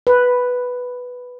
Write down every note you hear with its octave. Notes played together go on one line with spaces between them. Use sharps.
B4